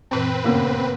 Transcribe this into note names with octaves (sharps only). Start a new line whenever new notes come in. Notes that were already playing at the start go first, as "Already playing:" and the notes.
F#2 A#2 E3 C4 B4
G2 C#3 A#3 B3 C#4